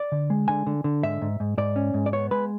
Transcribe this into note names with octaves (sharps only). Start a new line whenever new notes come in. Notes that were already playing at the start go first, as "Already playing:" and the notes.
Already playing: D5
D3
G#3
D3 G#5
D3
D3
G#2 E5
G#2
G#2
G#2 D5
C#4
G#2
D5
B3 C#5
G#3 B4